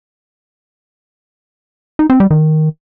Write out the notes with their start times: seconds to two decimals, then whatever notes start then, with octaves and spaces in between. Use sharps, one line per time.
1.99 D#4
2.10 C4
2.20 G3
2.31 D#3